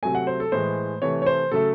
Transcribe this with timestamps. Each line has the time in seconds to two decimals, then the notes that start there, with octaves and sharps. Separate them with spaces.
0.02 C3 F#3 A3 G#5
0.15 F#5
0.27 C5
0.40 A4
0.52 A2 E3 G#3 C5
1.02 C3 E3 A3 C#5
1.22 C#5
1.26 C5
1.52 C#3 F#3 A3 A4